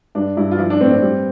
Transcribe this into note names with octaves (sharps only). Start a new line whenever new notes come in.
G2 D4
G2 E4
F4
F3 E4
D4
A2 C4
C4
G3